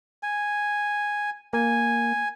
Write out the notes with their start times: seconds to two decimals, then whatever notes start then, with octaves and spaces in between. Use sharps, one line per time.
0.23 G#5
1.53 A#3 G#5